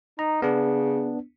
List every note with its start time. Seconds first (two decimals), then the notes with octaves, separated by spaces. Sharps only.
0.19 D#4 A#5
0.42 C#3 B3 D4